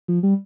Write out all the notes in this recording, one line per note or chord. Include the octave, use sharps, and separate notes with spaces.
F3
G3